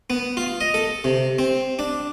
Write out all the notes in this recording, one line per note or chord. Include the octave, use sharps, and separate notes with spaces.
B3
F4
D#5
A4
C3
C4
D4